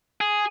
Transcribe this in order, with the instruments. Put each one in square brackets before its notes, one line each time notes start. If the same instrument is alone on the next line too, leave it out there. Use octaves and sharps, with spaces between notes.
[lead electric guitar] G#4